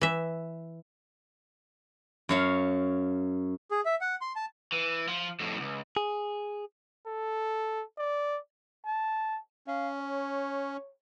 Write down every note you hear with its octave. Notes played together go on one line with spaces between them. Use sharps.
E3 E5
F#2 C#5 F5
G#4
E5
F#5
C6
A5
E3
F3
F2 A2
C#2 F#2
G#4
A4
D5
A5
C#4 F5
C#5